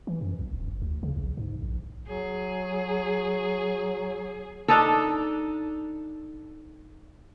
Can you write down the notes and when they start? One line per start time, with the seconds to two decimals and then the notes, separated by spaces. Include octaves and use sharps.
0.07 E3
0.21 F#2
0.39 B1
0.53 D#1
0.68 G1
0.82 D2
1.03 C#3
1.17 A#1
1.37 G#2
1.62 A#1
2.08 F#3 G#4
4.68 D4 D#4 A4